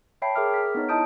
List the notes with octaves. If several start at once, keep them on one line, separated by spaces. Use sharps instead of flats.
C#5 E5 G5 A5 B5 C7
G#4 A#4 E5 D6 F6
F6 B6
B3 D#4 C#5
E4 D#5 A5 D#6 G6 D7